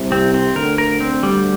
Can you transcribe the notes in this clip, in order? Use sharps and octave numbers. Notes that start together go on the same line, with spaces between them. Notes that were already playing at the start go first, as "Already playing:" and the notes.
Already playing: C2 C3
C4
C4
D2 D3 A#4
A#4
C4
G3